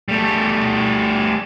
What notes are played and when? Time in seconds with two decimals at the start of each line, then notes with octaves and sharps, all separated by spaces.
0.09 G3 A3